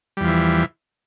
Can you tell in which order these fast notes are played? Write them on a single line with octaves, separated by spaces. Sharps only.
G3 E2 F3 E3